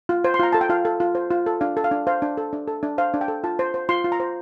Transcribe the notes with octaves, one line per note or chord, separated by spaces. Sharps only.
F4
C5
C6
F4 A#5
A4 A5
G5
F4 F5
A4
F4
C5
F4
A4
D4 F5
A4
F5
D4
C5 F5
D4
A4
D4
A4
D4
C5 F5
D4
G5
A4
F4 A5
C5
C5
F4 C6
F4
A#5
C5